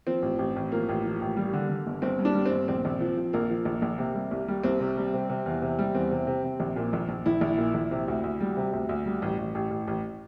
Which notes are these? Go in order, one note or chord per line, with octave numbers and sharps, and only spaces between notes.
F3 C4
A1
A1
A1
F3 A#3
A1
F3
A1
G3
D3
D3
G1
G1 C4
G2
D4
G3
C4
G1
A#1 C4
A#1
F3
F3
A#1 A#3
F3
A#1
A#1
C3
G3
C2
G3
C2 C4
C3
G3
C3
C3
E2
C3
G3
E2 C4
C3
C3
C3
A#1
A#2
A#1
A#1
A#1 E4
A#1
A#2
A#1
C3
D2
D2
G3
C3
D2
D2
G3
A1
A1
A1
A1
A1